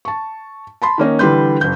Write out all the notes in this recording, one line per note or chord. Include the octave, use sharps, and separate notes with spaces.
A5 C#6
A5 B5 C6
D#3 A#3 C#4 D#4
D3 E3 G3 B4 C6 G6
F#1 G6